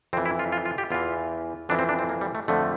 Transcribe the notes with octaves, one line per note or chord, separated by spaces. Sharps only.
F2 E3 C4
E4
F4
F4
F4
G4
E2 E3 F4
F2 E3 D4
C4
D4
C4
A#3
G3
A3
F2 D3 F3 A3